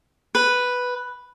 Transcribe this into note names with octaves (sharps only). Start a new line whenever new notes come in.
B4